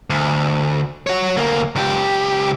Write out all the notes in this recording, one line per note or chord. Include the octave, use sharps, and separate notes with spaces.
D2
F#4 C#5
D2 A#3
C#2 G4